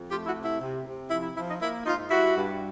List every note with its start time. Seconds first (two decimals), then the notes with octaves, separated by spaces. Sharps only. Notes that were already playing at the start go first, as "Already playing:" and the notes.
Already playing: F2
0.09 A3 F4 G4
0.26 E4 F#4
0.35 C3
0.43 E4
0.60 C3
0.85 C3
1.09 F3 E4
1.23 E4
1.35 F3 E4
1.48 D#4
1.60 A#3 E4
1.85 G#2 D#4 F4
2.10 G3 E4 F#4
2.36 G2